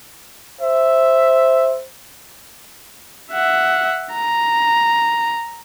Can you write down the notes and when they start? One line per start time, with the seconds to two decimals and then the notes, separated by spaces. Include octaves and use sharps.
0.61 C5 E5
3.32 E5 F#5
4.13 A#5